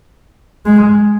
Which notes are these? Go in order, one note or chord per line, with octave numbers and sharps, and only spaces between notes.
G#3